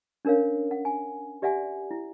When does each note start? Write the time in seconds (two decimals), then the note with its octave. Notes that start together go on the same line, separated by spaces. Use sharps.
0.25 C#4 D4 A#4 C#5 F5
0.71 F#5
0.85 G#5
1.42 G4 D5 E5 F#5 G#5
1.91 E4